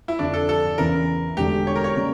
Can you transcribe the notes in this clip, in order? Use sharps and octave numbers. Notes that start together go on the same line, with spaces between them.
E4
F2 D3 F3 D4
A4
A4
E2 C#3 E3 A#4
E1 E2 D3 A3 G4
C#5
A#4
C#5
C#3 G3 A#3